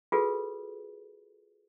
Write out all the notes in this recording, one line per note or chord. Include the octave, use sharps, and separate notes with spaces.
F4 F#4 G#4 A4 B4